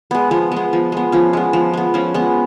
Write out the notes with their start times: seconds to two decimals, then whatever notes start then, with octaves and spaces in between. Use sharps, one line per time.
0.11 G#3 B3
0.31 F3 B3
0.52 G#3 B3
0.73 F3
0.92 G#3 B3
1.12 F3 C#4
1.33 G#3 B3
1.53 F3
1.73 G#3 B3
1.94 F3 C#4
2.14 G#3 B3